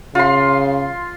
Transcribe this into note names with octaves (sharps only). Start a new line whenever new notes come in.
C#3 F4 C6